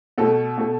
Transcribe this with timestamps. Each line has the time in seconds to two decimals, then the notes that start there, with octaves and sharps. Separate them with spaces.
0.18 B2 A3 A4
0.58 B2 A3